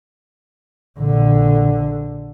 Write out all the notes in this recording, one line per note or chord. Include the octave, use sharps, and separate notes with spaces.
A#1 D3